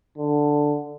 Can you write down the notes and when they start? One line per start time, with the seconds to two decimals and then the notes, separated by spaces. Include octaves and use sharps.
0.18 D3